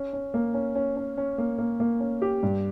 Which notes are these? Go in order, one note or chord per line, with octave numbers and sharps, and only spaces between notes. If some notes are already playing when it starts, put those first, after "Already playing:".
Already playing: C#4
C#4
A#3
C#4
C#4
C#4
C#4
A#3
A#3
A#3
C#4
G4
G2